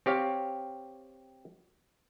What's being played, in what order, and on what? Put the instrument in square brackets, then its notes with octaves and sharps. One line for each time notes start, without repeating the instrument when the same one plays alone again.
[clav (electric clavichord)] C4 G4 C#5 F5